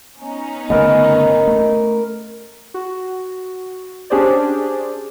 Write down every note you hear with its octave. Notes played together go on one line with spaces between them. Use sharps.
B3 C#4 D#4
G1 C#3 A3 A#4 B4 D#5
A3
F#4
C#4 D4 G4 G#4 C5 D5